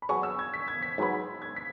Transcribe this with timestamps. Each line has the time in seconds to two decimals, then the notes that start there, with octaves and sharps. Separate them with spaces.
0.02 B5
0.09 F#3 B3 G#4 C#5 C#6
0.23 E6
0.39 G#6
0.54 B6
0.68 G#6
0.83 B6
0.98 G#2 F#3 B3 G#4 B4
1.42 G#6
1.56 B6